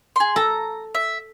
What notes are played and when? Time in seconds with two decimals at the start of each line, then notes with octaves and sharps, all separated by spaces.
0.16 G#4 C6
0.36 A4 A#5
0.95 E5